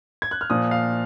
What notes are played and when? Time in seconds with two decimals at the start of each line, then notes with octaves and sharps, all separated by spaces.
0.22 G#6
0.31 F#6
0.41 F6
0.50 A#2 F3 D#6
0.71 F5